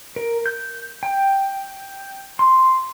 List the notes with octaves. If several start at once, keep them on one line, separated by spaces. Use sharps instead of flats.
A#4
G6
G5
C6